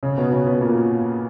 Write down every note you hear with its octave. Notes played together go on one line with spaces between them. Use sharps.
C#3 C#4
B2 B3
C#3 C#4
B2 B3
A#2 A#3